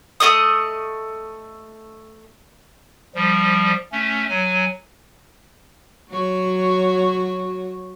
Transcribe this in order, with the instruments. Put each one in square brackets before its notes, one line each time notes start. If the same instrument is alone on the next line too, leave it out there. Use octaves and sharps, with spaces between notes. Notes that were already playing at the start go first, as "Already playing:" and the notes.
[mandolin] A3 F#4 D#5 D#6
[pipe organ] F3 G3
A3 C#4
F#3 G#5
[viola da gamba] F#3 F#4 C#5